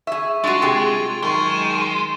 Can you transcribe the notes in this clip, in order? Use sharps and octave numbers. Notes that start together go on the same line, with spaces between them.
G#4 E5 C#6
G#3 D4 F4 F#4 C#6 A6 D7
C3 G4 G#4
F#2 D#3 G#3 C#6
D#7 E7